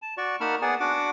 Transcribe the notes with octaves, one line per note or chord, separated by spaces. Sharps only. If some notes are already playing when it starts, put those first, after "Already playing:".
A5
F#4 D5 C#6
A#3 D#4 F#5 A5 B5 F6
B3 G#4 D5 F#5 G#5
D4 F#4 F#5 D6